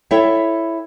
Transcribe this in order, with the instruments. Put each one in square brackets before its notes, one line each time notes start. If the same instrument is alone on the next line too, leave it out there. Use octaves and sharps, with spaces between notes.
[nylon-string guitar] E4 A4 C#5 E5 G5